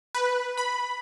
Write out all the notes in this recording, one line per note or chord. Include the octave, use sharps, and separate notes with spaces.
B4
B5